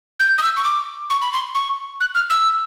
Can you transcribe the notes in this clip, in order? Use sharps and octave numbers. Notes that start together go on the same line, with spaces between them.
G6
D#6
E6
C#6
D6
C#6
B5
C6
C#6
F#6
F6
E6